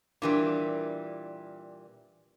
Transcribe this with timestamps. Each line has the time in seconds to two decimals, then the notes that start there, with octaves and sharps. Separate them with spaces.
0.22 A#2 E3 G3 D4 A#4